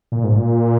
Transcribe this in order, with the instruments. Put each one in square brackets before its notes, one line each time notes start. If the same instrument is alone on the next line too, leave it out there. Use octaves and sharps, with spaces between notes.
[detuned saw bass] A#2
G#2
A#2